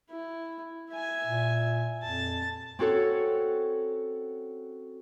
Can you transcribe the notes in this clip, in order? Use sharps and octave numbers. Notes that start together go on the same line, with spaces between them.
E4
E5 G#5
A#2
F2 A5
C4 C#4 F#4 A4 C#5